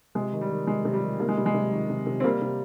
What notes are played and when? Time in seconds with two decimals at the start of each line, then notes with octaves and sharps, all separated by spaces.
0.15 C3 G#3
0.33 D#3
0.41 G3
0.50 D#3
0.67 C3 G#3
0.85 C3
0.94 G3
1.02 D#3
1.20 C3 A#3
1.28 G#3
1.37 C3 G3
1.46 G#3
1.54 C3
1.72 D#3
1.90 C3
2.06 C3
2.20 C4
2.24 C3 G3 A#3
2.41 C3